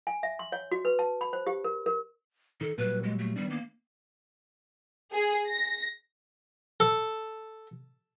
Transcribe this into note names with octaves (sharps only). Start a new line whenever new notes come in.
G#5
E5
C6
C#5
F#4
B4
A5
B5
C5
G4
A#4
A#4
D#3 A4
A#2 F#3 G3 B4
G#3
A3
D#3 G3 B3 D4
A#3
G#4
A#6
A4